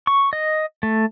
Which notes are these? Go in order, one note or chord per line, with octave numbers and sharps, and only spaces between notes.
C#6
D#5
A3